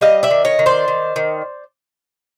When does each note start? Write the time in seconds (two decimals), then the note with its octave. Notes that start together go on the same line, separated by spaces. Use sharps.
0.01 G3 D#5 F5
0.23 D5 E5
0.31 D#3
0.45 C#5 D#5
0.59 D#3
0.66 C5 D5
0.88 D#3
1.16 D#3